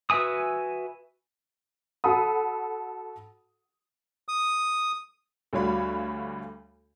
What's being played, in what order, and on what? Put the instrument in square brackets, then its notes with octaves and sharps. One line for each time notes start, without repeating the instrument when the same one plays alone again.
[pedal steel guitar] F#4 B4 E5 G#5 D#6
[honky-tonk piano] F#4 A4 F#5 B5 D#6
[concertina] D#6
[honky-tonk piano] D2 G3 F#4 C#5 F5 B5